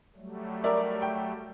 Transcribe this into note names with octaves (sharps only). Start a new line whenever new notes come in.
F#3 G3 A3
A#4 D5 E5
G5